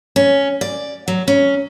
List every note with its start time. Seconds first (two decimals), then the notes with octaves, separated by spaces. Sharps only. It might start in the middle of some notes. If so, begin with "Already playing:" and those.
0.16 C#4
0.61 D5
1.08 F#3
1.28 C#4